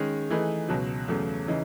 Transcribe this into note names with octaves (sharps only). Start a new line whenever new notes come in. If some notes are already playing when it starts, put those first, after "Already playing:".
Already playing: D#3 G#3 C#4
E3 A3 D#4 G#4 B4
C#2 B2 F#3
E2 C#3 F#3 A3
C#3 E3 D#4